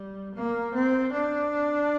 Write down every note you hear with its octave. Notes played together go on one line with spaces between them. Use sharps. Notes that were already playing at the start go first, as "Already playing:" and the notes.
Already playing: G3
A#3
C4
D4